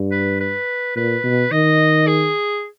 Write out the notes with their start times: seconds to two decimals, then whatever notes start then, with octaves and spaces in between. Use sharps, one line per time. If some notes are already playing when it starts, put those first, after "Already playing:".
Already playing: G2
0.12 B4
0.40 B4
0.96 A#2 B4
1.24 B2
1.52 D#3 D#5
2.08 G#4